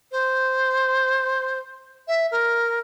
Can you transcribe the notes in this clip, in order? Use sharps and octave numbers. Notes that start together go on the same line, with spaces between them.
C5
E5
A#4